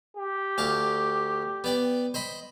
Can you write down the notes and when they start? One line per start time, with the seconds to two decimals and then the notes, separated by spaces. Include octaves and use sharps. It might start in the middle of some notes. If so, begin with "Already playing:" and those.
0.17 G4
0.58 D2 F5 A5
1.64 B3 D5 G5
2.14 C5 D#5 B5